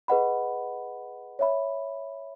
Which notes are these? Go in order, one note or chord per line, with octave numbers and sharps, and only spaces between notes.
G#4 B4 D#5 F#5 B5
C#5 E5 B5